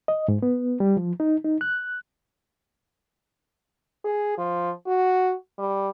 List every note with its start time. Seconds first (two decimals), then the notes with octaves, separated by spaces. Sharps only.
0.08 D#5
0.28 G#2
0.42 B3
0.80 G3
0.97 F3
1.20 D#4
1.45 D#4
1.61 F#6
4.04 G#4
4.38 F3
4.87 F#4
5.58 G3